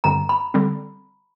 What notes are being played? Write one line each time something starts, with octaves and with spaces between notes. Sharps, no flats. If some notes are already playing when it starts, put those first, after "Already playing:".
G2 D3 G3 C4 A#5
B5
D3 G3 C4